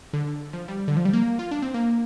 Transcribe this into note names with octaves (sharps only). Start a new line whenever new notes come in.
D3
F3
G3
D3
F3
G3
A#3
F4
D4
C4
A#3